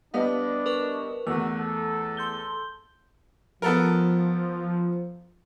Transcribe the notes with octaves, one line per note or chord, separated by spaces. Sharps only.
G3 B3 D4 D#5 F5
A#4 B4 C#6
E2 A3 F#4 E6
A4
C6 G6 G7
F3 B3 A4 A#4